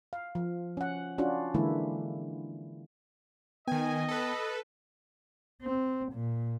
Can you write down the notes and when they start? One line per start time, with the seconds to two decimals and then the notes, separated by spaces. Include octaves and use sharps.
0.13 F5
0.35 F3
0.77 C#4 F#5
1.18 C#4 D4 F4 F#4
1.54 D3 E3 G#3 A#3 E4
3.68 D#3 B3 D#5 G5 G#5
4.09 A4 B4
5.62 C4
6.13 A#2